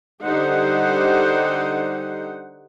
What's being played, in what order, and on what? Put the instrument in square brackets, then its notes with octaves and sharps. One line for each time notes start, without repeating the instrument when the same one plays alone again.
[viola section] D3 G3 D#4 G4 C5 F#5